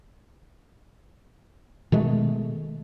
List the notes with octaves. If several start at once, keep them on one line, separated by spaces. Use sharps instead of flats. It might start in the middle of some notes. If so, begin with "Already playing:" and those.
B2 D#3 G#3 A3